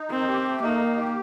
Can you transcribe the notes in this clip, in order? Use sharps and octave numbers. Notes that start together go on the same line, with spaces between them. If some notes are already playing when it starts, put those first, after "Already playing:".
Already playing: D#4
D#3 C4
G4
A3
A#3 D#4
D#3
G4